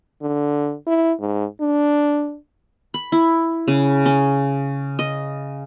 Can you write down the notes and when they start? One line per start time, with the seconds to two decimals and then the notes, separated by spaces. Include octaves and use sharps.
0.22 D3
0.87 E4
1.20 G#2
1.61 D4
2.94 B5
3.12 E4
3.68 C#3
4.06 C#4
4.99 D#5